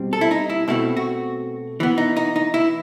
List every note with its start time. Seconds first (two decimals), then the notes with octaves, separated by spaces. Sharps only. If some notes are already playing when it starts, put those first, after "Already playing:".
Already playing: B2 G3 C4
0.13 A4
0.21 E4
0.31 D#4
0.50 E4
0.68 B2 A3 C4 E4
0.97 F#4
1.80 E3 B3
1.98 D#4
2.17 D#4
2.36 D#4
2.54 E4